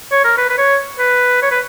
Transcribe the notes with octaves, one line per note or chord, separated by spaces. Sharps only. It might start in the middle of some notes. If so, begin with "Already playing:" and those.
C#5
A#4
B4
B4
C#5
B4
C#5
B4